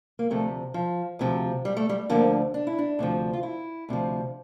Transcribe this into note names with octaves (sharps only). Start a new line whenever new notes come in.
A#3
D2 C3 F3 A3
F3
D2 C3 F3
G3
A3
G3
D2 D3 F3 A#3
D4
E4
D4
D2 C3 F3
F4
E4
D2 C3 F3